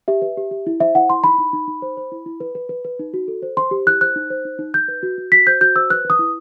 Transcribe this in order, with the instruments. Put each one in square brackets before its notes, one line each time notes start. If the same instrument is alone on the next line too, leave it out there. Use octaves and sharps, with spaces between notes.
[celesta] G4 E5
B4
G4
G4
E4
C5 E5
E4 F#5
E4 C6
D#4 B5
D#4
D#4
D#4
C5
C5
E4
E4
B4
B4
B4
B4
D#4
F#4
A4
C5
C5 C6
G4
E4 F#6
C5 F#6
D#4
C5
D#4
D#4
D#4 G6
B4
F#4
F#4
F#4 B6
C5 G6
F#4 G6
C5 E6
B4 F#6
B4 D#6
E4